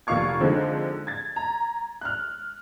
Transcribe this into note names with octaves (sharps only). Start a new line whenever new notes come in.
F1 A#3 F4 F5 C#6 G#6
D3 F3 G#3 A#3 C4 D#4
G#6 A6
A#5
F6 F#6